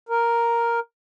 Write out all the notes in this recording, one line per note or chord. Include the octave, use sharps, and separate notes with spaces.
A#4